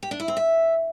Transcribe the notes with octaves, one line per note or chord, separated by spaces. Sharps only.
G4
D4
E4
C4
E5